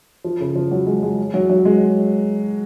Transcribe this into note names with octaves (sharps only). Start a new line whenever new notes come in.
F3
C#3
F3
F#3
G#3
G#3
F#3
F#3
G#3